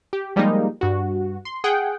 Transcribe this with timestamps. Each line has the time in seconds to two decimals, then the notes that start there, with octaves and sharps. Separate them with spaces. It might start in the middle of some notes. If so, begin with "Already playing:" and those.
0.13 G4
0.36 F3 G3 G#3 A#3 D#4
0.81 G2 F#4
1.45 C6
1.64 G#4 F#5 G5